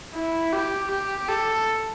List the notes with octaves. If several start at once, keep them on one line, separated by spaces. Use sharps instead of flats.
E4
G4
G4
A4